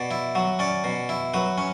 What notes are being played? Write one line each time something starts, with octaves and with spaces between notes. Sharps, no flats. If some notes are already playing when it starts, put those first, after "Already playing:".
Already playing: B2 D5
E4
F#3
C#4 D5
B2
E4
F#3 B4
C#4